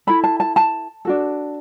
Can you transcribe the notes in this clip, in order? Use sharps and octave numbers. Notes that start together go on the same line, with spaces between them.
E4 A4 B5
A5
A5
A5
D4 F#4 A4